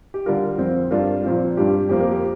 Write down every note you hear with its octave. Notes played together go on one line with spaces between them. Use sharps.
G4
D3 G3 D4 F4 A#4
F2 F3 C4 F4
G2 G3 D4 F4 A#4
A#2 F3 C4 F4
G2 G3 D4 F4 G4
F2 F3 A#3 G4
A#4
G4